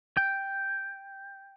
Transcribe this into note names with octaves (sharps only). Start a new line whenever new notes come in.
G5